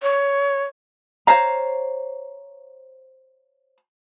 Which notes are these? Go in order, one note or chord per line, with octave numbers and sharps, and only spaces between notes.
C#5
C5 C#5 F5 A#5